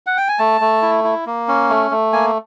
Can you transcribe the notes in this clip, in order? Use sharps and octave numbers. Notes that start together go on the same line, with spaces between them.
F#5
G5
G#5
A3 A5
A3
E4
E4
A#3
C#4
A3
A3
A#3 G#5